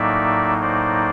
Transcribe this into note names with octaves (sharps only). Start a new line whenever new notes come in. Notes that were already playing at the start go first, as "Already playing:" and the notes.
Already playing: A2 F#3 A#3 D#4 D5 E5
C5 D5